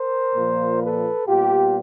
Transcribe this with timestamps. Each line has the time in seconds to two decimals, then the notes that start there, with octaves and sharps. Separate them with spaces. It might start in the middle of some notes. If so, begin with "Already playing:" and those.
Already playing: A#4 C5
0.36 A#2 F3 A#3
0.81 A4 B4
1.28 A#2 G3 B3 F4 G4